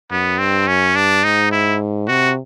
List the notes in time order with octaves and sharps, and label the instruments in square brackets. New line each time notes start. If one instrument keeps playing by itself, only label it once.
[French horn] F#2 [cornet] B3
[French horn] G2 [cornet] C4
[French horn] F#2 [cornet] C#4
[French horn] G2 [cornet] D4
[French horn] G#2 [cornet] D#4
[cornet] E4
[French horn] C3 [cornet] F#4